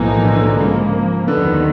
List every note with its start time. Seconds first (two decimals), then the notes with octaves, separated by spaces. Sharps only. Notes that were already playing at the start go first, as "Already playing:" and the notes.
Already playing: B1 A2 E3 F3 A#3 D#4
0.25 D3
0.36 D3
0.48 D3
0.59 G#2 C#3 F3 A#3
1.28 D#2 D3 D#3 F#3 B3